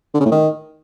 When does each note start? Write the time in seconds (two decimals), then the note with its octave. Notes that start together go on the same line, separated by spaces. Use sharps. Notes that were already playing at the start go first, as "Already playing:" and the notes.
0.14 D3
0.20 C#3
0.26 A2
0.31 D#3